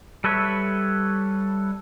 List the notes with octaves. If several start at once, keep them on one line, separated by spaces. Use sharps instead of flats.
G3 A4 B4 C#5 E5